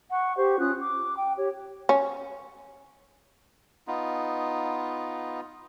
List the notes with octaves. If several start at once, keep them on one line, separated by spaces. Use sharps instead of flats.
F#5 C#6
G4 C5 C#6
C#4 F4 D#6 F#6
D6
G5
G4 C#5
C#4
B3 D#4 F4